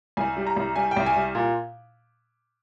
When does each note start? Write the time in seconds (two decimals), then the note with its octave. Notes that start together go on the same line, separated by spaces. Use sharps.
0.17 C2 G#5
0.37 G3
0.47 A#5
0.56 C2
0.76 G3 G#5
0.91 G5
0.96 C2
1.06 G#5
1.16 G3
1.35 A#2